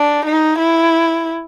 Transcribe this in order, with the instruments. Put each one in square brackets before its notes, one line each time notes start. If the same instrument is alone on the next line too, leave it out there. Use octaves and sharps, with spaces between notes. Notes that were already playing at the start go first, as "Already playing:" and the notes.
Already playing: [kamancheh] D4
D#4
E4